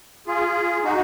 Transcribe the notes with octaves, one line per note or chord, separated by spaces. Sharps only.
F4 G#4
D#4 F#4